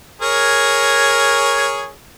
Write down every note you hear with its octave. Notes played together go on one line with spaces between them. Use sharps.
G#4 A#4 C#5